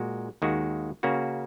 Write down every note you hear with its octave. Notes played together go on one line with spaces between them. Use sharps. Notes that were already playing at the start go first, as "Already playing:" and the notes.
Already playing: A#2 G#3 F#4
D#2 D#3 G#3 F#4
C#3 A#3 C#4 F#4